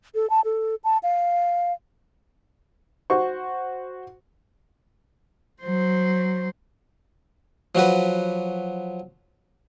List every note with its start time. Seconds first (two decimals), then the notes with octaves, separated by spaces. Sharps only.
0.15 A4
0.30 A5
0.45 A4
0.84 A5
1.03 F5
3.10 F#4 C5 C#6
5.63 F#3 C5
7.75 F3 F#3 F#4 B4